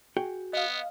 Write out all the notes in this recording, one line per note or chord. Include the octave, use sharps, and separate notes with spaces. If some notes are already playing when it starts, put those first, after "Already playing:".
F#4 G#4 G5
B3 D#5 F5